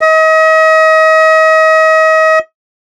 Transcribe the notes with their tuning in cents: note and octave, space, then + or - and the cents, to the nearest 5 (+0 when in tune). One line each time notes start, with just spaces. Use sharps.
D#5 +35